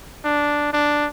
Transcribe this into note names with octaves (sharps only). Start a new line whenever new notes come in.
D4
D4